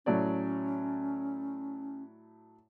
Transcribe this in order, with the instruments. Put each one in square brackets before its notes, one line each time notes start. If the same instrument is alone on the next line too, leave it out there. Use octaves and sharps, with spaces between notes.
[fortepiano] A2 F#3 D5 [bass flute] C#4